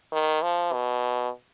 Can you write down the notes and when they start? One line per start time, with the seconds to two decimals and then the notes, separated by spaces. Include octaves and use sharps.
0.12 D#3
0.43 F3
0.73 B2